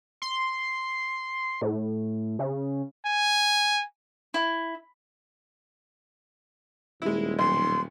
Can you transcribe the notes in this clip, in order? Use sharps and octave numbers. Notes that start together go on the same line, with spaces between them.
C6
A2
C#3
G#5
E4
D#1 G#3 E4
B1 C6